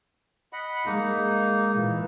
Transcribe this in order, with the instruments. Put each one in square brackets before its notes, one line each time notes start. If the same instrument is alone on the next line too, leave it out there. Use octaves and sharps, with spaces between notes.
[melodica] D#5 F#5 B5
[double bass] G#3 [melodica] A#3 D#4
[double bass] A#2 E3